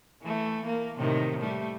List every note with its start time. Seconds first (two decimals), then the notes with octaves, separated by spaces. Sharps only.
0.22 E3 A3
0.66 A#3
0.97 A2 C3 D#3
1.41 G3 A3